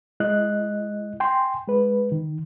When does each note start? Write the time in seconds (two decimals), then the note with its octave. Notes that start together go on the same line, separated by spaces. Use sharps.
0.20 G#3 E4 D#5 F#6
1.20 G5 G#5 C6
1.67 G#3 B4
2.12 D#3